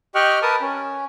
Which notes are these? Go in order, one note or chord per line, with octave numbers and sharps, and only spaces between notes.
G4 D#5 G5 C#6 F6 F#6
A#4 B4 A5 D#6
C#4